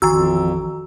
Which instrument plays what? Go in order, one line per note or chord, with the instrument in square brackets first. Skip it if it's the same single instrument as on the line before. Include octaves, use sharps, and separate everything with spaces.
[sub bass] A1 [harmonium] F2 [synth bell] D#3 A#5 E6 [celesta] F#4